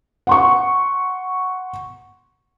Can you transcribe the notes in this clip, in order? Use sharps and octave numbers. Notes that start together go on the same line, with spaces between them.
F#5 C6 C#6